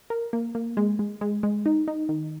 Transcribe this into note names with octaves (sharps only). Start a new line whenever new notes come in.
A#4
A#3
A#3
G#3
G#3
G#3
G#3
D#4
D#4
D#3